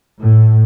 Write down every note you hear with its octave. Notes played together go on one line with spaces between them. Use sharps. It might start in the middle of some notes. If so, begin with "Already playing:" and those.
A2